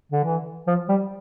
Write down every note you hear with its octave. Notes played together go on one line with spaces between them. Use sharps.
D3
E3
F3
G3